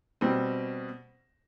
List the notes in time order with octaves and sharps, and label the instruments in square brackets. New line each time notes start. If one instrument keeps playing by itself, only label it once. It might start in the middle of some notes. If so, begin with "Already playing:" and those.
[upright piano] B2 G3 C4